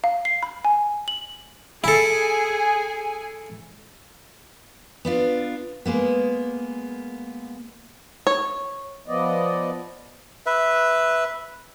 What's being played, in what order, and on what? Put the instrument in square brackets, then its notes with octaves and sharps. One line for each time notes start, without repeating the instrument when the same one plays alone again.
[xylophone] F5
C7
B5
G#5
F#7
[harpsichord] E4 A4 [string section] G#4 G#5
[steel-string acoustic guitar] B3 D4 F4
G#3 A#3 B3
[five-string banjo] C#5
[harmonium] F3 B3 D5 D#5
[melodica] B4 E5